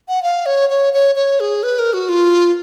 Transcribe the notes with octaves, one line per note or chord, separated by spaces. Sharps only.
F#5
F5
C#5
C#5
C#5
C#5
G#4
B4
A#4
F#4
F4